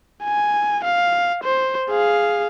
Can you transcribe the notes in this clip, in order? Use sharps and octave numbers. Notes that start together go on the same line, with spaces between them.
G#5
F5
C5
G#4 F5